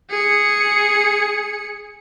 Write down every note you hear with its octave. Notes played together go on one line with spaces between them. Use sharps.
G#4 C#7